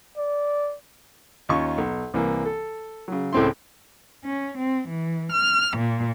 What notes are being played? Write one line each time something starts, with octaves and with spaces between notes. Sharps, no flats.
D5
D#2 C#4 F4 C#6
B1
C2 E3 A#3
A4
C#3 F#3
C#2 A2 A3 C4 E4 C6
C#4
C4
E3
F6
A#2